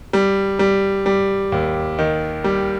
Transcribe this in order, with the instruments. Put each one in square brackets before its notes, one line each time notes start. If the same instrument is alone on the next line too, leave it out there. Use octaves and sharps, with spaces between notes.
[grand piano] G3
G3
G3
D#2
D#3
G3